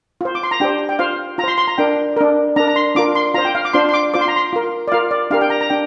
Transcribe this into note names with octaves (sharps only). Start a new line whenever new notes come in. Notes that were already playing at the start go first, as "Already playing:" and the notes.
F4 C5
D6
C6
A#5
D4 G4 C5 G5
G5
F4 C5 F5
F4 A#5
C5 C6
C6
A#5
D4 A#4 G5
D4 A#4
D4 A#4 A#5
A#5
C6
D4 F4 A#4 D6
C6
F4 C5 A#5
G5
F5
D6
D4 F4 C5 C6
C6
D6
F4 C5 D6
C6
A#5
C6
F4 A#4
D5
F4 A#4 F5
D5
D4 G4 A#4 F5
G5
A#5
A#5
D4 G5